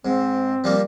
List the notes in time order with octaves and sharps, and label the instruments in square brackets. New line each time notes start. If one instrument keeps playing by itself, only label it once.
[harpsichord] G#2 [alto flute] C4
[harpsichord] F3 G3 A#3